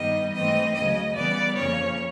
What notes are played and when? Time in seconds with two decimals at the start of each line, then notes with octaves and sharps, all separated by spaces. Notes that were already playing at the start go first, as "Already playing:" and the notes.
Already playing: G2 D#3 G3 B3 D#5
0.34 G#2 E3 A3 C4 D#5
0.74 D2 C#3 F#3 D#5
1.15 C#3 E3 G3 B3 D5
1.56 F2 C#3 F3 A#3 C#4 C#5